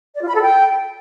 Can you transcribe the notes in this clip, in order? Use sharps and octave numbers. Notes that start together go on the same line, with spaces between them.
D5
F4
B5
A4
G5